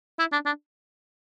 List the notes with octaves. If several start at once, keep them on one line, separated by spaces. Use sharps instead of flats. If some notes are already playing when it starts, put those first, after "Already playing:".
E4
D4
D4